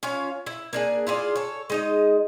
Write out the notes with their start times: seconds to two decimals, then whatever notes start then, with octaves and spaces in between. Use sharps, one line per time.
0.03 C#4 F4 C#5 F5
0.46 E4
0.73 A#3 D4 G#4
1.07 E4 F4 G#4 D5
1.36 A4 C#5
1.70 G#3 D#4 D#5